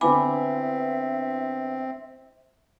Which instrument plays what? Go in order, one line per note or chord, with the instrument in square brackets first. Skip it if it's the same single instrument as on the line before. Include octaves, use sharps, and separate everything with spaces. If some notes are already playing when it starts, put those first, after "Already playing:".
[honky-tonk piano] D3 B3 E4 [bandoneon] C4 [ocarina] E5 [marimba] G#5 B5 D6